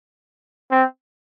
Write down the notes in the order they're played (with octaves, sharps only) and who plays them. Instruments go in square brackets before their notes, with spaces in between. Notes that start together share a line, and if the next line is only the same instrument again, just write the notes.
[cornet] C4